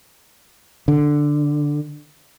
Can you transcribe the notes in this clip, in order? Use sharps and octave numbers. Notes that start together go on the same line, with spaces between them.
D3